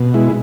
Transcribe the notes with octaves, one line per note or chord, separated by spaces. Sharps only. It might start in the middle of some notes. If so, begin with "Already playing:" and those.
Already playing: B2
G#3 E4